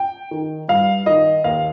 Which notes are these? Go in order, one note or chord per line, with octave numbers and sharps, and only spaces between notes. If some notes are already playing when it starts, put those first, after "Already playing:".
Already playing: G5
D#3
G2 F5
D#3 D#5
D#2 F5